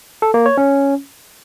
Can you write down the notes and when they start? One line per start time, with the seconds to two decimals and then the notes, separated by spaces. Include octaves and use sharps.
0.22 A4
0.34 A#3
0.46 C#5
0.57 C#4